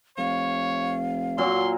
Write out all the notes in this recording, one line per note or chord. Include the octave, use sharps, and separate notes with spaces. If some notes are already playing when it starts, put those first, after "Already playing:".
F1 C#5 F5
A#2 F#3 C6